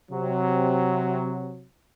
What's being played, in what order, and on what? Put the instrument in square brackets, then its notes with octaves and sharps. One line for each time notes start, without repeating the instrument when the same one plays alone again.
[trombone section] C3 F#3